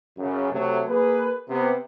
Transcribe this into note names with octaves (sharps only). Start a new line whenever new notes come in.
F#2 C#3
C3 F#3 A3
A#3 G#4 B4
C3 B3